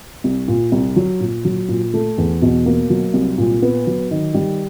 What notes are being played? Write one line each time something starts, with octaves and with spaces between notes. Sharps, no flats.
C2
A#2
C2
F#3
A#2
F#3
A#2
A3
E2
B2
A#3
F#3
C2
A#2
B3
F#3
D#3
G3